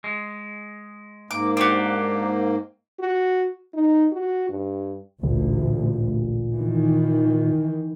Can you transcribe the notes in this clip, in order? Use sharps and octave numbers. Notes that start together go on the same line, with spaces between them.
G#3
G#2 A#3 D6
C4 D4 F#4 G4
F#4
D#4
F#4
G2
A1 D2 A#2
D#3 E3